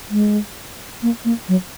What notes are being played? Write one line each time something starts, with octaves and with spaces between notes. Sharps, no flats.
G#3
A#3
A#3
F#3